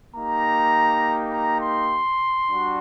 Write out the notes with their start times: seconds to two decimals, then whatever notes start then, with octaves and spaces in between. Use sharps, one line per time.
0.15 A#3 D#4 G4 A#5
1.33 A#5
1.62 C6
2.50 G3 D4 F#4